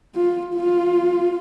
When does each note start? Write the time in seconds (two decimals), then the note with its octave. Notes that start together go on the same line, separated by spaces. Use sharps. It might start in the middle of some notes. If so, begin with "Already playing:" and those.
0.15 F4
0.54 F4